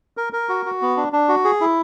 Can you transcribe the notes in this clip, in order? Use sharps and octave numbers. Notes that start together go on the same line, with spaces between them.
A#4
A#4
F#4
F#4
B3
D4
D4
F#4
G#4
E4